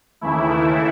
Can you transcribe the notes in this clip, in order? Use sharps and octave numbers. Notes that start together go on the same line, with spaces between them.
D#2 C#3 E3 A3 E4
E4